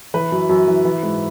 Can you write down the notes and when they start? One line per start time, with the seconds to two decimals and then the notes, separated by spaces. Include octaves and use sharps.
0.14 E3 B4
0.32 F#2
0.49 F#2
0.68 E3
0.85 E3
1.03 G#2